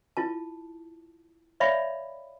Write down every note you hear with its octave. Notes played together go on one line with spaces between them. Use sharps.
E4 F4 A5
C#5 D5 E5 F5 B5